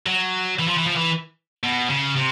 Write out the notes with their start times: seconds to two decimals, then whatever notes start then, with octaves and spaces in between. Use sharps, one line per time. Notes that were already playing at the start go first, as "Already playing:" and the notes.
0.06 F#3
0.59 E3
0.68 F3
0.77 E3
0.86 F3
0.95 E3
1.64 B2
1.90 C#3
2.16 C3